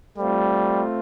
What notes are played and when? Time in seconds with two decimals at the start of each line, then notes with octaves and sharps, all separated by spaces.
0.18 G3 A3 C4 F4